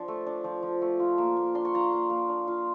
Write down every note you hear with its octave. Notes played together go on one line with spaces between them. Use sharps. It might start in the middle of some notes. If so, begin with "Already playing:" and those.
Already playing: F3 D4 A5
A3
D4
F3
F3
A3
F4
A#3
A#3
D4 C6
C#6
F4 A#5 C6
A#3
A#3
D4
F4